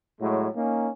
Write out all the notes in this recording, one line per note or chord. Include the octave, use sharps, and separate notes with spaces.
A2 F#3 G#3
A#3 C#4 D#4